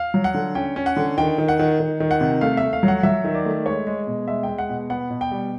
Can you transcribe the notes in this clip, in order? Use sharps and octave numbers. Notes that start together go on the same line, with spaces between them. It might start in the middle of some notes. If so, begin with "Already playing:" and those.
Already playing: F5
F#3
F#5
D3
C#4 G5
C#4
F#5
D3
D#3 G5
D#3
F#5
D#3
D#3
D#3
F#5
C3
A3 F5
A3 E5
F5
F#3
F#5
F#3 E5
D#3
D5
A3
G#3 C#5
G#3
B2
G#3 E5
G#3 G5
F#5
B2
B3 F#5
B2
G5
G3